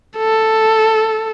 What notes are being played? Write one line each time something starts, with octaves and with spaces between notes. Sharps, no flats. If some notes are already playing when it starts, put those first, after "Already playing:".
A4